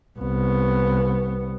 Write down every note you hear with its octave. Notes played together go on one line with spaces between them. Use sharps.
C2 B3